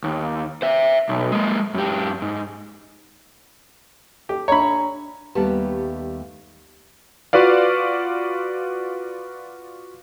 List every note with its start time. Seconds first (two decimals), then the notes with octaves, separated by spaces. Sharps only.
0.04 D#2
0.62 C5 E5
1.09 B1
1.32 G#3 A#3
1.74 F#2 G4
2.22 G#2
4.29 G4 A4
4.48 D4 C#5 A#5 B5
5.35 D#2 G3 A3 B3 G4 A5
7.33 F4 F#4 B4 D5 F5